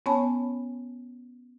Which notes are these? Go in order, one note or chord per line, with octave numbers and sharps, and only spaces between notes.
B3 C#4 C#5 G#5 A5 B5